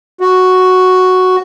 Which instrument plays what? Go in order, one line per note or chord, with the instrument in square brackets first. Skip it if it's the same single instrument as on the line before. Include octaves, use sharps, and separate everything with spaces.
[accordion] F#4